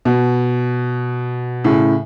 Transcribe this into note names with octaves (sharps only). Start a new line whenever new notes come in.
B2
A2 C#3